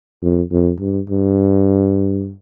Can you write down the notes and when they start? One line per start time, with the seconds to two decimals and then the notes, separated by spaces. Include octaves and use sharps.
0.22 F2
0.51 F2
0.80 G2
1.10 G2